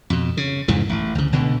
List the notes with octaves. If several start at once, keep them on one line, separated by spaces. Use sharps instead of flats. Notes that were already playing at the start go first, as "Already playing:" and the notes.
F2 B2
C#3
F2 G#2 C#3 E3
A1
D2 C#3
C#2 B2 D3